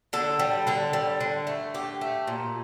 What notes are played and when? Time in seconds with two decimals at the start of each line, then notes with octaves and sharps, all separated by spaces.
0.13 D3 A4
0.39 G3
0.67 D3 A4
0.93 G3
1.20 D3
1.47 A3
1.74 D3 G4
2.01 A3
2.27 A#2